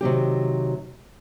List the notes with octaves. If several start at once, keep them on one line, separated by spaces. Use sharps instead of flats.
C3 D#3 F#3 G4